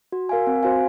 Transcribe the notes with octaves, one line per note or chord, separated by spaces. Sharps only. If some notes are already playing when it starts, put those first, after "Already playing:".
F#4
A#4 F5 G#5
C4
F#4 C5 F5 G#5